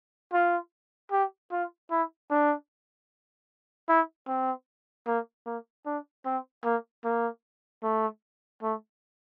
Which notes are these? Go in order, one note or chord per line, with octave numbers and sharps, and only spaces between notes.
F4
G4
F4
E4
D4
E4
C4
A#3
A#3
D4
C4
A#3
A#3
A3
A3